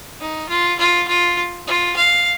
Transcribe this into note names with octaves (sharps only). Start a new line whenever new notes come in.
D#4
F4
F4
F4
F4
F5